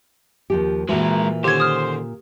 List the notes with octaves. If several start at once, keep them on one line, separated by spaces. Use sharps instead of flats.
D#2 F3 G4
A#2 E3 G#3 F#4 A#4
D3 D#3 C#4 G4 C5 G#6
D#6 F6